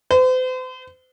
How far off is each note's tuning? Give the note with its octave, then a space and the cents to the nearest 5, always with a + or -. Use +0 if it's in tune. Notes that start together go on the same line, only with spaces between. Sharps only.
C5 -40